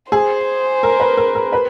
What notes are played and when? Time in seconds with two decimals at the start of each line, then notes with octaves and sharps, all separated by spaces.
0.12 G#4 C5
0.83 A#4
1.00 B4
1.17 A#4
1.35 A#4
1.53 B4